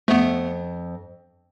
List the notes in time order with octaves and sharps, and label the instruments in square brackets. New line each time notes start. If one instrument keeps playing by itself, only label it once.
[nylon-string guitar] F2 [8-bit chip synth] A3 B3